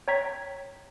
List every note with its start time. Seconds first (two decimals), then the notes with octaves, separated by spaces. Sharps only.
0.08 C#5 G5 A#5 G#6 B6